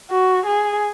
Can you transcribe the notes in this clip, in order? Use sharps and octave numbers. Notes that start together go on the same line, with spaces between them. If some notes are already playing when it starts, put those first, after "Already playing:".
F#4
G#4